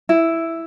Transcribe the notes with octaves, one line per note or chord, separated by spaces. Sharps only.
E4